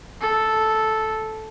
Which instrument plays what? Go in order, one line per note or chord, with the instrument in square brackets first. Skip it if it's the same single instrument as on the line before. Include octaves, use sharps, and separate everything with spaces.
[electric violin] A4